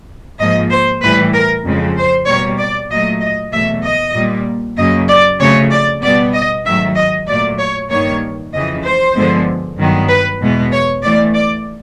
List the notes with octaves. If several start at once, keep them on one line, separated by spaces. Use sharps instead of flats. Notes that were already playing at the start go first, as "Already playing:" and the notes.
G#2 F3 A#3 D#5
C5
A2 E3 G3 B4
A#4
F2 C#3 F3 G#3
C5
B2 G3 A#3 C#5
D5
A#2 F#3 A3 D#5
D#5
E2 B2 F#3 A3 E5
D#5
A#2 G3 A#3
F#2 C#3 F#3 A#3 D#5
D5
F2 C#3 F#3 A3 C#5
D5
B2 G3 B3 D5
D#5
G#2 D#3 F#3 A3 E5
D#5
A#2 F#3 A3 D5
C#5
G2 D#3 G3 A#3 C#5
F2 C#3 E3 D#5
C5
G2 D3 F3 G#3 B3
G2 D#3 F#3 B3
B4
E2 B2 G#3 B3
C#5
A2 E3 A3 D5
D5